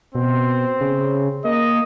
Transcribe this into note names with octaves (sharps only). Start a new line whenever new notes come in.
B2 C4
C#3
A#3 D#5